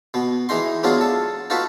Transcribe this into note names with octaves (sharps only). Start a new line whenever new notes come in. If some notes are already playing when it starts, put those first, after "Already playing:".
B2 B3
E3 G#3 D#4 C6
F#3 G#3 B3 D4 F4 G#4
A4
D#4 F4 F#4 A4 B4